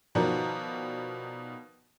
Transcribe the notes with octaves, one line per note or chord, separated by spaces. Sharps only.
B2 D#3 F3 F#4 A#4 D5